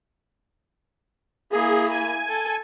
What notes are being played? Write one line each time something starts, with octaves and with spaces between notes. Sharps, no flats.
A#3 E4 G#4
G#5
A4